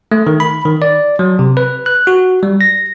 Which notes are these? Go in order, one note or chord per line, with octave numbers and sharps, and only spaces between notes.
A3
D#3
B5
D#3
D5
F#3
C3
B4
F#6
F#4
G3
A#6